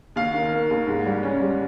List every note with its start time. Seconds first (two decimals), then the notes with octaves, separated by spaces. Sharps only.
0.16 D#2 F5
0.34 D#3
0.52 A#3
0.70 D#2
0.87 G#2
1.06 G3
1.23 C#4
1.42 G3